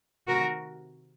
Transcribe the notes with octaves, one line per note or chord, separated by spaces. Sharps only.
C3 D#3 A3 F#4 A#4